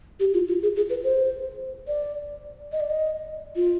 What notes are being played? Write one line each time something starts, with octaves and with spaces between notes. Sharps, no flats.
G4
F4
F4
G#4
G#4
B4
C5
D5
D#5
D5
D#5
F4